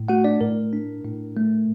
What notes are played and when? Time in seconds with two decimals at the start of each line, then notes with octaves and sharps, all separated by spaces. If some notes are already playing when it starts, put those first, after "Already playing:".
Already playing: A2
0.08 A3 F#4 F#5
0.24 D4 D5
0.41 A2 A#4
0.73 D4
1.04 A2
1.37 A3